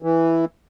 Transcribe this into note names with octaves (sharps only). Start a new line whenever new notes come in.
E3